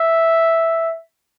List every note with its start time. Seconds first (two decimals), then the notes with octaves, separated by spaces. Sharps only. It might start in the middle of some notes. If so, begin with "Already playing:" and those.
Already playing: E5